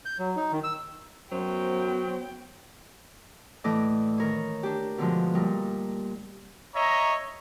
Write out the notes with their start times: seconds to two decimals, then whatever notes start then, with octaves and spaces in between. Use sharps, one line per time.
0.05 G6
0.19 F#3
0.36 D#4
0.52 D#3
0.64 E6
1.32 F#2 F#3 B3 C5 G5
3.64 A2 E3 A3 D5 D#5 D6
4.18 D#3 A#4 C#5
4.63 D4 G4
4.98 B2 D3 F3 G#3
5.34 A#2 G3 D#4
6.76 C#5 D#5 E5 A#5